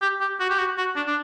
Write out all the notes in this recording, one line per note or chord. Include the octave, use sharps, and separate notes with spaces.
G4
G4
F#4
G4
F#4
F#4
D4
D4